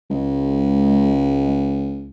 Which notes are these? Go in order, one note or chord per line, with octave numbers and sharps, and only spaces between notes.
C#2 G#3